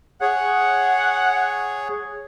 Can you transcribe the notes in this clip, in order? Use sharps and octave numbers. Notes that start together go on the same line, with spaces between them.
G#4 C#5 F#5